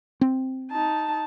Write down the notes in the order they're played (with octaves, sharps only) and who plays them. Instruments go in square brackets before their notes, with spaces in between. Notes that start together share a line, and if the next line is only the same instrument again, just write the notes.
[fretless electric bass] C4
[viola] D#4 A5